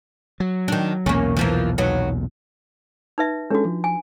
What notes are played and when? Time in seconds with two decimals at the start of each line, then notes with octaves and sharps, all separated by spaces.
0.40 F#3
0.68 D#3 D4
1.06 B1 E2 A#2 A#3 C#4
1.37 E3 F3 A#3
1.78 D#2 F#3 B3
3.18 D#4 B4 E5
3.51 G#3 C#4 D4 F#4 A4
3.65 F3
3.84 G#5